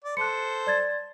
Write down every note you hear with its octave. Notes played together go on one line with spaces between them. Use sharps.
D5
A4 C5 F#6 C#7
D5 G#6 A6